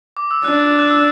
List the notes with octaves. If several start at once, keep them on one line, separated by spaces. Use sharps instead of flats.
D6
E6
D4 F#6
F#6
E6